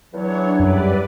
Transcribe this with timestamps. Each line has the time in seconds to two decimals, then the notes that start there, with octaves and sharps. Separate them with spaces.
0.14 E2 F#3 D4 C#5
0.59 F#2 G3 B4 D5